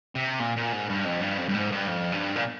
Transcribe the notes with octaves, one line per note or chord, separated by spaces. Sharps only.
C3
A#2
A#2
G#2
G2
F2
G2
F2
G2
G#2
G2
F2
G2
A#2